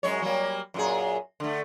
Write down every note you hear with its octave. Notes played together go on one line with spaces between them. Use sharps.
F#2 G#3 C#5
F#3 G3 A#3
F#2 A#2 G#4
D3 A3